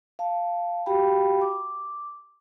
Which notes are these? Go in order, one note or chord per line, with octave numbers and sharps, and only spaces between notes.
F5 A5
F#4 G4 F5 G5 B5
D6